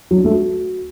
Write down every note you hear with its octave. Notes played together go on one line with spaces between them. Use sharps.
F#3
D4
A3
F#4